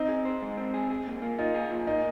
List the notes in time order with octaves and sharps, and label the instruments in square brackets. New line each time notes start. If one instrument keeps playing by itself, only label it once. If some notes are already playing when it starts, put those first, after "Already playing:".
Already playing: [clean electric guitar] C4 [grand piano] D#4
[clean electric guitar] G#4
C5
G#3
C4
G#4
G#4
A#2
A#3
[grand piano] D#4 [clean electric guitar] F4
[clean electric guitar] G#4
A#2
[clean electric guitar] A#3 [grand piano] D#4